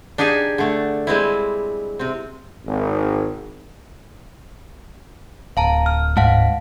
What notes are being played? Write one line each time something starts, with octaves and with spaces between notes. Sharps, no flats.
D4 D#4 G4 G#4 G#5
D3 A3
G3 G#3 C4 E4
C3 C4
G#1
D1 F5 A5 A#5
F6
G#2 F5 F#5 A5